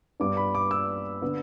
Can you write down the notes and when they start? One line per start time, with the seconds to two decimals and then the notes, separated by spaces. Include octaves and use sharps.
0.20 G2 G3 B3 D4 D6
0.37 B5
0.55 D6
0.71 E6
1.22 D3 B3